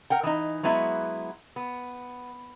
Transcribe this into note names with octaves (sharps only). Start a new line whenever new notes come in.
A#4 F#5 G5
E3 D#4
F#3 G#3 B3 E4
B3